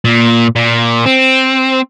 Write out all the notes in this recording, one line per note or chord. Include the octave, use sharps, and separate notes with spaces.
A#2
A#2
C4